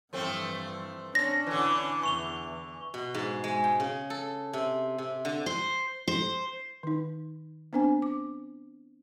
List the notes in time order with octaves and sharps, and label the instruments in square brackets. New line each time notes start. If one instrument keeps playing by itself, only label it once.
[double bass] G2 E3 [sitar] F3 A3 C4
[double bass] C#4 D4 [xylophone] A#6
[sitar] D3 E3
[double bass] E2 [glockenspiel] C#6 F7 G7
[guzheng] B2
G#2
G#3
G5
C#3
A4
C3
C3
D3
[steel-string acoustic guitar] C5
C5
[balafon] D#3 D#4
B3 C4 D4 C5 G#5
D6